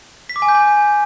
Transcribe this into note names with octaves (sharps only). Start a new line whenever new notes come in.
B6
D6
G#5
G6
G#5